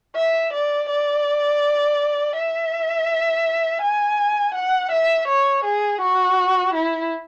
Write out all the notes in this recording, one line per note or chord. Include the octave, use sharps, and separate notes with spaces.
E5
D5
D5
E5
G#5
F#5
E5
C#5
G#4
F#4
E4